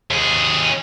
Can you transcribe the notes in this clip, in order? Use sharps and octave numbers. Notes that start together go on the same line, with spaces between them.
D#2 G#4